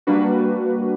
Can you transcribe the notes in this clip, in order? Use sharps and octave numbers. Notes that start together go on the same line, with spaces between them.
G3 A#3 D4 F#4 B4